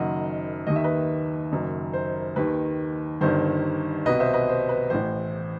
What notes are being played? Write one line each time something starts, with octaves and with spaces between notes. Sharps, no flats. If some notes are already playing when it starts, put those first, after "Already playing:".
Already playing: F#1 F#2 D#3 D#5 F#5
D#2 D#3 D#5
E5
B4 D#5
F#1 F#2 D#3
C5
D#2 D#3 B4
G1 G2 D#3 C5
C2 B2 B4 D#5
C5 E5
B4 D#5
C5
B4
A1 A2 E3 C5